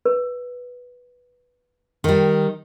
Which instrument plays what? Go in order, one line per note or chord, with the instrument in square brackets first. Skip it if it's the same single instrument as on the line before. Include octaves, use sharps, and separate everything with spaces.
[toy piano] B4
[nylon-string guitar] D#3 G3